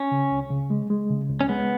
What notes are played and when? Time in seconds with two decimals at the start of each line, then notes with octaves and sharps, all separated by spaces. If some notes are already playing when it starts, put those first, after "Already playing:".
Already playing: C#4
0.11 C#3
0.31 C#2
0.50 C#3
0.70 G#3
0.90 G#3
1.10 C#3
1.30 C#2
1.41 C#4
1.49 G#3 B3